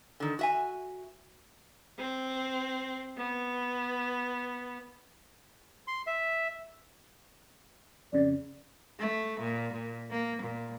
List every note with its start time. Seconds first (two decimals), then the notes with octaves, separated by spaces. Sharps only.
0.20 D3 D#3
0.39 F#4 E5 G#5
1.99 C4
3.18 B3
5.88 C6
6.07 E5
8.13 F2 C#3 D5
9.00 A3
9.39 A#2
9.72 A#2
10.10 A#3
10.42 A#2